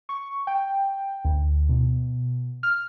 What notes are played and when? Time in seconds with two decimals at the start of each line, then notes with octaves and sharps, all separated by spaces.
0.09 C#6
0.47 G5
1.25 D2
1.69 B2
2.63 F6